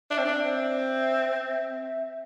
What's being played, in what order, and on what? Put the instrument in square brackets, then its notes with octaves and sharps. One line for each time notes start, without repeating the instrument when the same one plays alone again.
[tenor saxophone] D4 [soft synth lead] E5
[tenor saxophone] C4
D4
[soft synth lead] D5
[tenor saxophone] C4
[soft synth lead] E5